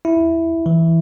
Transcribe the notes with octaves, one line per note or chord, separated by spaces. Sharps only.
E4
E3